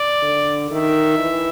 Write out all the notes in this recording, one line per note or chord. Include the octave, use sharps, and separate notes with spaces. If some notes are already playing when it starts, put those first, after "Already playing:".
Already playing: D5
D3
D#3 E5
E3